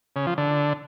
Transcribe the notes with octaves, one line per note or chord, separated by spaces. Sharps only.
C#3
F3
D3